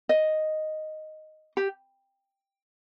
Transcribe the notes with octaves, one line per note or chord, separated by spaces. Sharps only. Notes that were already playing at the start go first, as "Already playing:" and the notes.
D#5
G4